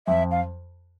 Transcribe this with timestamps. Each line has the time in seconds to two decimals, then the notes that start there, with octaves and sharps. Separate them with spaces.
0.07 F2 E5
0.31 F5